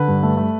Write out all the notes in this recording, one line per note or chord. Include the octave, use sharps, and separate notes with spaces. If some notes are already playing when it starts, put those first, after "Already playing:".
Already playing: D3 B4
G2
A3
A3